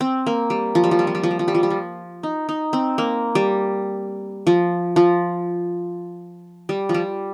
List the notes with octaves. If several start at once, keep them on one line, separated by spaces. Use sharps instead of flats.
C4
A#3
G3
F3
G3
F3
G3
F3
G3
F3
G3
F3
G3
F3
G3
F3
D#4
D#4
C4
A#3
G3
F3
F3
G3
F3
G3